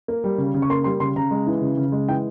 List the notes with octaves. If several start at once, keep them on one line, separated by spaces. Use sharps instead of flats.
A#3
G3
C#3
C#3
C#6
A#3 C6
G3 C6
C#3 C6
C#3 A#5
G#3
E3
C#3
C#3
G#3
E3 G5